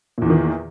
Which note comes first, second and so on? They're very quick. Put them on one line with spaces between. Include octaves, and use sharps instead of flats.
A#2 E2 E3 D#3